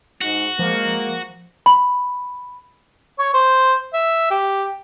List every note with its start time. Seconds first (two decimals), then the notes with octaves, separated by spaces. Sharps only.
0.21 G#2 F#4
0.59 F3 G#3 A#3
1.66 B5
3.19 C#5
3.34 C5
3.94 E5
4.31 G4